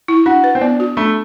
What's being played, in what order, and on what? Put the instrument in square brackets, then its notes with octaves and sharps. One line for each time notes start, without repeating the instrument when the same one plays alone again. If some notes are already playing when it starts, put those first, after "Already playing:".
[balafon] E4
[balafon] D4 [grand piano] F#4
[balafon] B4
[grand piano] C4
[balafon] B3 [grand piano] D4
[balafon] F#4
[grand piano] A3 [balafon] D4